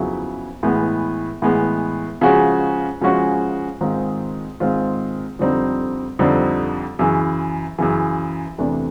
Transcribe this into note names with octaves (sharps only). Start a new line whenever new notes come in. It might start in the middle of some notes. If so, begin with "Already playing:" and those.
Already playing: F2 C#3 F#3 B3 E4
A2 E3 G#3 B3
A2 E3 G#3 B3
C#3 F3 G#3 C#4 F#4
C#3 F3 G#3 C#4 F#4
G#2 D#3 G#3 C4 F4
G#2 D#3 G#3 C4 F4
F2 D3 G3 C4 D#4
F2 D3 G3 C4 D#4
F#2 C#3 E3
F#2 C#3 E3
E2 C3 E3 A3 D4